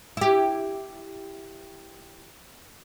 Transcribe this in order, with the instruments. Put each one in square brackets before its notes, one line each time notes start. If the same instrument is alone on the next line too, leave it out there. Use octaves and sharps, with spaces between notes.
[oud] E4 G4